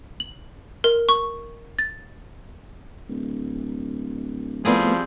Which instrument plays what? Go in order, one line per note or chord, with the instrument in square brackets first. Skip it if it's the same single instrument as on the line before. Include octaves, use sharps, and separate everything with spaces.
[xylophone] F#7
A#4
C#6
A6
[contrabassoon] D1
[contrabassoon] A2 [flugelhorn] F3 [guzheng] G3 C4 G#4 [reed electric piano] A3 B3